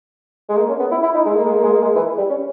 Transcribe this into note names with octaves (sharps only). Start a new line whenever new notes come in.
G#3
A#3
C#4
B3
E4
E4
D#4
G#3
A#3
G#3
A#3
G#3
A#3
G#3
E3
G3
C#4